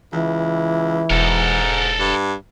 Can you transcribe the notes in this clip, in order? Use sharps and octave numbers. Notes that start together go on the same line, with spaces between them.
C#2 E3
E1 G#2 A4 A#4
G2